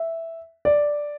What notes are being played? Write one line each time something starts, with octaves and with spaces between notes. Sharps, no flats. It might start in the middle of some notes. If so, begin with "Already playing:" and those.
Already playing: E5
D5